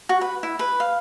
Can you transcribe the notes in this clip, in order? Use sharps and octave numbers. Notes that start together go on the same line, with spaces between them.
F#4
B4
E4
B4
F5